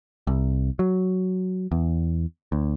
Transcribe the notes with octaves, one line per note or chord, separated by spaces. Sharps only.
C2
F#3
E2
D2